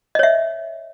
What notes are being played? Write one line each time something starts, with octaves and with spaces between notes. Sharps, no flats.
C#5 D#5 E5